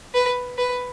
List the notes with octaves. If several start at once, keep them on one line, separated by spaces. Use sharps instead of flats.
B4
B4